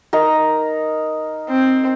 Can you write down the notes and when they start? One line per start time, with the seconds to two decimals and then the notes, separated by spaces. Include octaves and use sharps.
0.13 D#4 A#4 A#5
1.50 C4